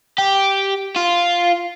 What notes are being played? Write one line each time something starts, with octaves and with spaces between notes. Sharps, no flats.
G4
F4